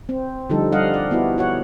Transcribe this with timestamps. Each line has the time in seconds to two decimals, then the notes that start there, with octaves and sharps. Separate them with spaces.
0.09 C4
0.50 D3 F3 G3 D#4 A4
0.72 G3 D4 D#5 F5 F#5
0.94 D5
1.11 B3 E4 F#4
1.38 F#4 C#5 F#5